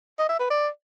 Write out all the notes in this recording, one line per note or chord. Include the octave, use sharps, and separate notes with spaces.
D#5
E5
B4
D5